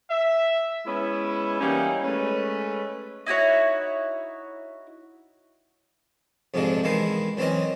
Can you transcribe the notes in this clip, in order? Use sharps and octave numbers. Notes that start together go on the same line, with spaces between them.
E5
G#3 B3 C#4 E4
E3 G3 A#3 C#4 D#4
G#3 A3 C#4 B4
D#4 E4 F#4 C#5
F2 G#2 C3 F3 G#3 D4
E2 D#3 G#3 E4 C6 D#6
F#2 E3 C4 C#4 D#5